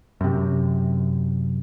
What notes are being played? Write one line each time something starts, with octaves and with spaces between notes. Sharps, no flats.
F#2 C3